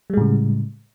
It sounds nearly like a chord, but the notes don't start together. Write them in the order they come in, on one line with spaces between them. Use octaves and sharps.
G3 G#3 A2 C#3